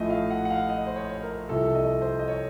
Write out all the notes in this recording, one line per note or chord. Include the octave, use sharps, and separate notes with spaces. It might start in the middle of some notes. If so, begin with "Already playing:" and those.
Already playing: A#1 A2 F3 A3 D#5
F5
F#5
F#5
F5
D#5
C5
C#5
A#4
C2 C3 F3 A4
D#5
C5
D#5
C#5